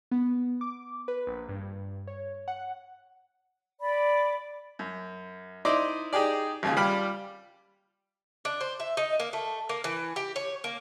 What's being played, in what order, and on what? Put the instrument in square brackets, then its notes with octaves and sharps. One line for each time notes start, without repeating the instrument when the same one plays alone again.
[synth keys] B3
D6
B4
A#1
G2
C#5
F#5
[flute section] D5 B5
[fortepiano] F#2
D#4 E4 C5 D5 D#5 D6
D#4 G4 G#4 D5
G#1 D#2 C#3 F4
G3 F4 B5 F6
[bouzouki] D4
C5
E5
D#4
A#3
A3
A#3
E3
G4
C#5
A#3